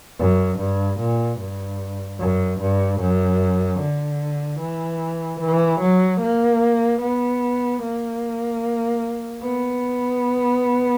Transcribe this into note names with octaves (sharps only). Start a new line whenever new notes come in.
F#2
G2
A#2
G2
F#2
G2
F#2
D3
E3
E3
F#3
A#3
B3
A#3
B3